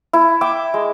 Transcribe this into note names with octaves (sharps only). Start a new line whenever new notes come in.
E4
E5 G5 D6
G#3